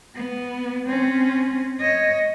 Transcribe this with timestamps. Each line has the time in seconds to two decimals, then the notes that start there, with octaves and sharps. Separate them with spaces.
0.15 B3
0.87 C4 C#4
1.80 C#5 D#5